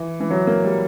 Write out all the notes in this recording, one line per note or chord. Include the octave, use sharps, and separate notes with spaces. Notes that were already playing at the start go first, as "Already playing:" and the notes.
Already playing: E3
E3
F#3
A#3
G3